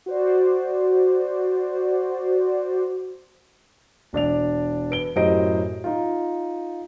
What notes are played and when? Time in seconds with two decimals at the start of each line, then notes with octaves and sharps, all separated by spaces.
0.06 F#4 C5 D5
4.13 E1 D4 D5 F7
4.91 B4 D7 G7
5.16 F#2 A2 G4 C5 D#5 D7
5.84 D#4 F4